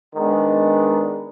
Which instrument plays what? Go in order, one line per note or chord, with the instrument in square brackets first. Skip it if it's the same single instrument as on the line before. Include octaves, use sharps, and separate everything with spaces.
[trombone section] D#3 G#3 B3 D4